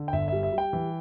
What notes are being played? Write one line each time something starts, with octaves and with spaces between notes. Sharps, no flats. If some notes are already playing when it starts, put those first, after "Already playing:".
Already playing: D3
G5
G1 E5
G3 E5
E5
G3
G5
E3